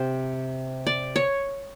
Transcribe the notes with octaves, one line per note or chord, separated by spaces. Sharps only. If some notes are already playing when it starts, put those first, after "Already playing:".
Already playing: C3 C5
D5
C#5